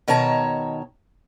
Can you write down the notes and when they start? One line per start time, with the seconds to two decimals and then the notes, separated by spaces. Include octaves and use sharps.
0.08 B2 D#3 C#5 A5 A#5